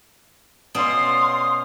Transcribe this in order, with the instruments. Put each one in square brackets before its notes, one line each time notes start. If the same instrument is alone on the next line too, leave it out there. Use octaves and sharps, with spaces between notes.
[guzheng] B2 C#4 D5 [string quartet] F5 C6 [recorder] D#6